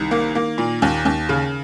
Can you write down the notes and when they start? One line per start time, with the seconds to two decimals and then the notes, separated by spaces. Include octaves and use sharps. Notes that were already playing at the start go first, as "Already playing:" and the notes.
Already playing: C2 D#3
0.11 A#3
0.35 A#3
0.58 A#2
0.82 D#2
1.05 D#2
1.29 C#3